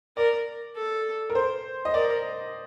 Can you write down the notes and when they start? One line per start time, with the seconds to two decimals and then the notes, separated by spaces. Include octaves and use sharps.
0.17 A#4 D5
0.76 A4
1.30 A#4
1.35 C5
1.85 D#5
1.94 A#4 D5